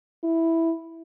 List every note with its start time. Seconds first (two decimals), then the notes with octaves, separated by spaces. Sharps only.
0.23 E4